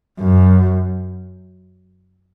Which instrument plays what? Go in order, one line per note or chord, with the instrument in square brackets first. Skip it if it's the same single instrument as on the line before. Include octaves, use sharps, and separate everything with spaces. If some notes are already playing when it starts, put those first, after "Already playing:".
[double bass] F#2